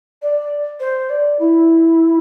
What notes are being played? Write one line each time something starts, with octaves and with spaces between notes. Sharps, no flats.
D5
C5
D5
E4